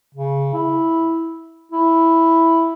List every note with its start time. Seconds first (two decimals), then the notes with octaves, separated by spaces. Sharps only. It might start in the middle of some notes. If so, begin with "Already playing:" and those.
0.15 C#3
0.54 E4
1.72 E4